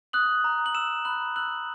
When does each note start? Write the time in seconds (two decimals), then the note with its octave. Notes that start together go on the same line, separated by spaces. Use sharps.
0.13 D#6 F#6 F#7
0.44 A#5
0.66 F#7
0.75 E6 E7
1.05 B5 F#6 F#7
1.36 E6 F#6 F#7